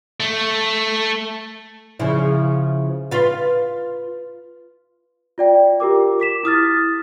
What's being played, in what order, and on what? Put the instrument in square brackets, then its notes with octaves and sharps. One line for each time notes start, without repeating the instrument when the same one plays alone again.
[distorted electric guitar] A3
[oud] C#3 F3 E4
F4 B4
[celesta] F4 D5 G5
F4 G4 A#4 D6
D6 B6 E7
E4 D#6 F6 A6